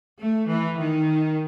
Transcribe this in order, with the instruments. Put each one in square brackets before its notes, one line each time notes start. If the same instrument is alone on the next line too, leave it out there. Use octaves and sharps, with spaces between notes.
[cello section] A3
E3
D#3